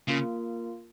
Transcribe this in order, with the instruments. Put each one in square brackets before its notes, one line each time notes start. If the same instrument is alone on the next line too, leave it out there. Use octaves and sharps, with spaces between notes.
[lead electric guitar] C#3 [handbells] A#3 F4 A#4